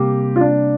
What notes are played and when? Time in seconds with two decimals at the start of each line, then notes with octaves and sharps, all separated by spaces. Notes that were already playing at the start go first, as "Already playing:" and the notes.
Already playing: C3 G3 A#3 G4
0.36 F4
0.41 D4